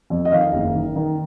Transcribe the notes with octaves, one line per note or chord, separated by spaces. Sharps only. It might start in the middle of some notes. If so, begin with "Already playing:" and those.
F2
D#5
D#3 F5
F#1
D#3
D#3